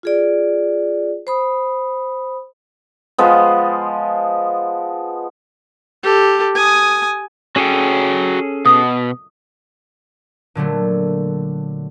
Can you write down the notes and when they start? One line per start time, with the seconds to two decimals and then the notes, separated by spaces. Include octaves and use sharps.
0.03 F4 G#4 D5
1.27 C5 B5 D#6
3.18 F3 G#3 B3
6.03 G4 A4
6.55 G#5 D#6
7.56 C#4 F#4 G#4 A4 C#5 G5
8.66 B2 D#6
10.55 A#2 D3 F#3 A3